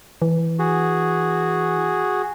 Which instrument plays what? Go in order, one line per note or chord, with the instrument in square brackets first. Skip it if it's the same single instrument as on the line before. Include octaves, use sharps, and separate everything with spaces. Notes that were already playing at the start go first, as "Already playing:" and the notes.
[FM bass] E3
[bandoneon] F#4 G#4